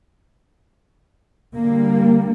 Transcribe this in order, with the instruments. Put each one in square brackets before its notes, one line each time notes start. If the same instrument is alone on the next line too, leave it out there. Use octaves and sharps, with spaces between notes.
[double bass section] D3 G3 A#3